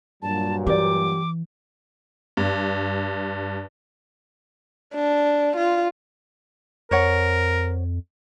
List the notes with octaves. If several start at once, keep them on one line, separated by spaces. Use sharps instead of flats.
G2 A#2 F#3 A5
E3 G4 D5 D6
G2
D4
F4
F2 A#4 C5 C#5 F#5